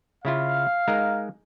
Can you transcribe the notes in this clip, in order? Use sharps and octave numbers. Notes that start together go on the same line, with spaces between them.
C#3 E4 F4 F5
G#3 D#4 A#4